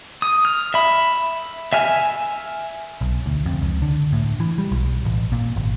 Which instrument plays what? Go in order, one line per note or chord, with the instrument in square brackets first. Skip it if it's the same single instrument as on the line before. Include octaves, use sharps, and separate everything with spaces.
[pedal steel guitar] D#6
F6
E5 B5
E5 G#5 F6
[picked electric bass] B1
D2
F2
C#2
D3
A2
E3
G3
B1
A1
A#2
G#1